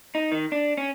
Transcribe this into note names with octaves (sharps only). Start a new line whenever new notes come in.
D#4
D#3
D4
C#4